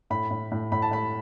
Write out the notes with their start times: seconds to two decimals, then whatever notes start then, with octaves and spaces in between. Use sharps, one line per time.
0.10 A2 B5
0.31 A2
0.52 A2
0.72 A2 B5
0.82 A5
0.91 A2 B5